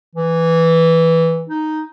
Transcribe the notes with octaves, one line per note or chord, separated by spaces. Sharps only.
E3
D#4